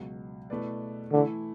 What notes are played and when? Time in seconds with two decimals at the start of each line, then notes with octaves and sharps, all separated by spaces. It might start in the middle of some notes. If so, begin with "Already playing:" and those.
Already playing: C#2 B2 F#3
0.50 B2 A3 E4 B4 D5
1.12 D3 E3 A3 E4